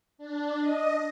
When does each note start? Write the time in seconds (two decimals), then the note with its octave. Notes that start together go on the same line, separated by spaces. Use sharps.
0.18 D4
0.60 D#5